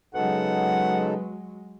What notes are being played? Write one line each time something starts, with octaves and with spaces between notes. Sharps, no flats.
C#3 F#3 G#3 B3 D#4 A4 F#5